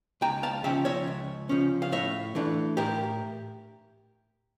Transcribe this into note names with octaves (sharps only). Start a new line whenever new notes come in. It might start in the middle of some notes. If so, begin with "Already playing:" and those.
C#2 G5 A#5
F5 A5
C#3 F3 C#4 E5 G5
C#5 E5
C#2
C#3 F3 C#4
F5
A2 C#5 E5
E3 A3 D4
A2 G4 A#4